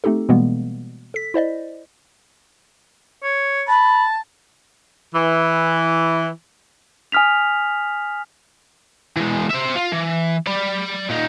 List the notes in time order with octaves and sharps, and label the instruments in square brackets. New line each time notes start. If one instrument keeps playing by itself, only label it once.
[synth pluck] A3 C4 D#4 G4 A4
B2 E3 G3 G#3 A#3 B3
A4 B6
E4 C5 D5 D#5
[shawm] C#5
[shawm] A5 [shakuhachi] B5
[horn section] E3
[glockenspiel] G#5 D#6 F6 B6 F7
[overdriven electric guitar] E3 G#3
C5 E5
F4
E3
D5 B5
A#2 D#4